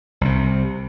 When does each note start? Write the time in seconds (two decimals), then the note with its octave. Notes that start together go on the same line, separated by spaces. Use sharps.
0.21 C2 C3